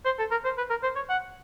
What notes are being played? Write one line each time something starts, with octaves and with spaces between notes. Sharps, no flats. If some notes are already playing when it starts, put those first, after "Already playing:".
C5
A4
A#4
C5
B4
A#4
C5
C#5
F#5